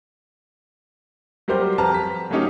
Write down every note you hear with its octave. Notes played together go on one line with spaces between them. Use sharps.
F#3 G3 G4 A#4 C5 G6
F2 B4 A5 A#5 F6
B6
F#3 A3 A#3 C#4 D#4 G4